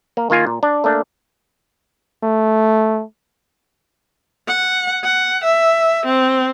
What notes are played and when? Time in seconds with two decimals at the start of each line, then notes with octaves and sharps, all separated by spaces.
0.17 A#3
0.30 D#3 A#3 F4 G#5
0.47 A#2
0.63 D4
0.84 A3 A#3 D4
2.23 A3
4.48 F#5
5.04 F#5
5.44 E5
6.06 C4